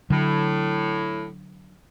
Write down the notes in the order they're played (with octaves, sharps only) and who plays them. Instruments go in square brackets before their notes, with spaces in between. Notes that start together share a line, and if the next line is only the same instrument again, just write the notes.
[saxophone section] A2 [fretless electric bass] D3 F#3